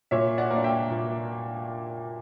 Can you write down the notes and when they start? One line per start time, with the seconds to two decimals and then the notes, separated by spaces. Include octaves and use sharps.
0.11 A#2 C#5 E5
0.38 D5 F#5
0.51 A#3 D4
0.64 E5 G5
0.90 A#2